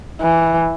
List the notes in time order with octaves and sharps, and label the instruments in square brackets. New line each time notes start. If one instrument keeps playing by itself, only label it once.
[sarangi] E3